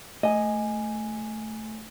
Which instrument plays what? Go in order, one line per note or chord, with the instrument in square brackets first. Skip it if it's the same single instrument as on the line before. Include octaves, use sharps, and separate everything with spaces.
[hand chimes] A3 G#5 [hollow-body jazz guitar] D#5